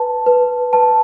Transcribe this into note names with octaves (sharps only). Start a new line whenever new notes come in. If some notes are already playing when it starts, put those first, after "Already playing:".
Already playing: B4 A5
B4
B4 A5